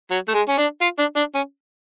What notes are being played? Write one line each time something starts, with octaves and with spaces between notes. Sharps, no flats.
F#3
A3
G#3
C#4
D4
F4
D4
D4
C#4